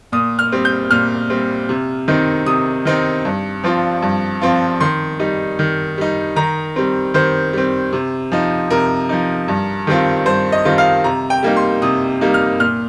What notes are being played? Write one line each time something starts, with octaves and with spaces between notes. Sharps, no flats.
A#2 D#6
F6
G3 C4
G6
A#2 F6
G3 C4
C3
D#3 C4 D#4
C3 D#6
D#3 C4 D#4
G2
F3 C4 F4
G2
F3 C4 F4
D#3 C6
G3 D#4
D#3
G3 D#4
D#3 A#5
G3 C4
D#3 C5
G3 C4
C3
F3 D#4
C3 A#4
F3 D#4
G2
D#3 G3 C4 F4
G2 C5
D#5
D#3 G3 C4 F4
F5
C3 A#5
G5
G3 A#3 D#4
C6
C3 D#6
G3 A#3 D#4
F6
A#2 F6